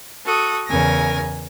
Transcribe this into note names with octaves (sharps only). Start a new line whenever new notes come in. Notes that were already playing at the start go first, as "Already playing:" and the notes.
F#4 A4 D#6
E2 C#3 A#4 G#5 A#6